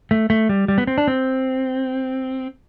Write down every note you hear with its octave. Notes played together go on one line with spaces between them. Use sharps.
A3
A3
G3
G3
B3
C4
D4
C4